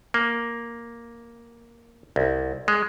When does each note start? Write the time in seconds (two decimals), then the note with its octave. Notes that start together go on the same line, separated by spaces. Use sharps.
0.14 A#3
2.16 C2
2.68 G#3